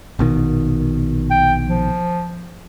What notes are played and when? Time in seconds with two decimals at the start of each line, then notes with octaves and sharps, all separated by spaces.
0.19 A#1 B2 D#3
1.30 G5
1.66 F3